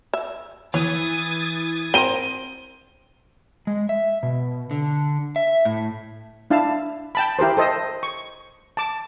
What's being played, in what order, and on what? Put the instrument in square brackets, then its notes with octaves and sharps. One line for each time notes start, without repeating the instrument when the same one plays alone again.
[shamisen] E5
[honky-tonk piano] E3 [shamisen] C#5 [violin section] D#6 G#6 A6
[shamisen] C4 A#4 C5 [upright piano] D#7 G7
[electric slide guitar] G#3
E5
B2
D3
E5
A2
[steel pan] D4 E4 F5 A5
G5 A5 B5
E4 G4 A#4 C5
A4 C5 D#5
C#6
A5 D6